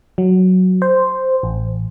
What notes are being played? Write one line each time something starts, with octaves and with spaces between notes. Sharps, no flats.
F#3
C5
A1